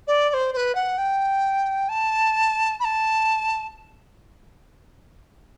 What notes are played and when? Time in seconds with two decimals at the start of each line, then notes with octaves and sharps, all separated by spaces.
0.07 D5
0.29 D5
0.34 C5
0.53 C5
0.57 B4
0.75 F#5
0.98 G5
1.89 A5
2.80 B5
2.84 A5